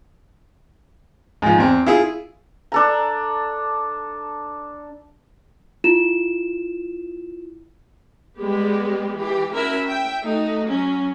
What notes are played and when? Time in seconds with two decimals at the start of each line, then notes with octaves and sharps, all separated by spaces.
1.42 G#2 F3
1.58 E2 C4
1.86 E4 F4 G#4
2.72 D4 A4 A#5
5.84 E4 F4 E7
8.38 G3 G#3 B3 G4
9.18 E3 G4
9.52 C#4 E4 F#4 A#4 E5
9.87 E5 G5
10.24 A3 D#4 F#4
10.70 F#3 C#4